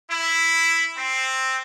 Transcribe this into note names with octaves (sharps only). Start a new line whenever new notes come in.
E4
C4